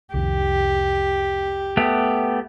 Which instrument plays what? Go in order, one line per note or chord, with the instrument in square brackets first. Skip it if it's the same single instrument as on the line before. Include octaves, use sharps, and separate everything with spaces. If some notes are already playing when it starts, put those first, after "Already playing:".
[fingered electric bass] C2 F2 D#3 [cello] G4
[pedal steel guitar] A3 B3 G4